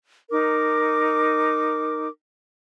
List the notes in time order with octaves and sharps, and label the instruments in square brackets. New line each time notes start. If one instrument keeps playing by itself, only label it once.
[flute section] D#4 A#4 D6